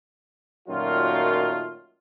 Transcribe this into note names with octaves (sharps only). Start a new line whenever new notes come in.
F#2 A#2 D#3 F#3 A3 F4